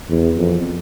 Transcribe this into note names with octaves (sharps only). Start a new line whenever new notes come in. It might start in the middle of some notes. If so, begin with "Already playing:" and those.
E2
F2